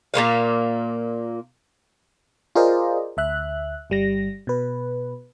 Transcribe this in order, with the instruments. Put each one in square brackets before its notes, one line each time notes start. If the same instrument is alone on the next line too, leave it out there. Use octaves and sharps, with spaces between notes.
[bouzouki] A#2 G#3 A#3 F5
[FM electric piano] F4 G#4 A#4 C5 D5 D#5
D2 E5 F#6
G1 G3 A#6
B2 B4